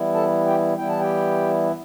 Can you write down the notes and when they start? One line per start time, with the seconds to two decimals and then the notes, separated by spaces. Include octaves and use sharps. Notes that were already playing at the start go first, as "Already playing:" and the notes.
Already playing: E3 G3 B3 E4
0.14 A4 A5
0.46 G4 G5
0.77 E3 G3 B3 E4 G5
0.89 A5
1.00 G4 G5